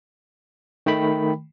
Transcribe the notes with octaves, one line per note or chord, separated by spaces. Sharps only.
D#3 A3 G5 B5